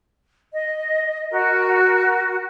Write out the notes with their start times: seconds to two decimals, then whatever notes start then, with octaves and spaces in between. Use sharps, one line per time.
0.52 D#5
1.31 F#4 A#4